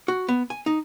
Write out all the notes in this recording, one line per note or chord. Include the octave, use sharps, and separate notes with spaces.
F#4
B3
G#5
D#4